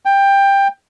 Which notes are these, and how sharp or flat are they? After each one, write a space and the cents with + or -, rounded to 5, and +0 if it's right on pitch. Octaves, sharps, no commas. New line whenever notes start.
G5 +15